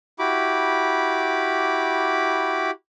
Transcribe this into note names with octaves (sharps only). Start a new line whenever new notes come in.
E4 F#4 G4 B5 D6